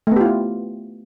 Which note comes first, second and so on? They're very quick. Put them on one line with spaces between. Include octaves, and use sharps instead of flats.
A3 B3 G4 F4 E4